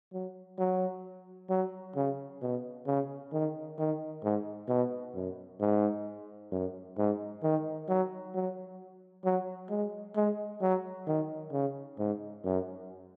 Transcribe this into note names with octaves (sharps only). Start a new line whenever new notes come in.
F#3
F#3
F#3
C#3
B2
C#3
D#3
D#3
G#2
B2
F#2
G#2
F#2
G#2
D#3
F#3
F#3
F#3
G#3
G#3
F#3
D#3
C#3
G#2
F#2